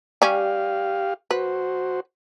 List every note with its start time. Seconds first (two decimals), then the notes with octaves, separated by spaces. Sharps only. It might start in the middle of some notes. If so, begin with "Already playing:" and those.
0.22 G3 C#4 G4 F5
1.31 F#4 B4 C5